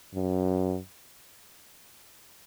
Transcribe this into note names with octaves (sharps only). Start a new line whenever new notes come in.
F#2